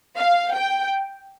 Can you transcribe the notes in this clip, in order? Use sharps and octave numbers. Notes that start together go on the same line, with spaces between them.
F5
G5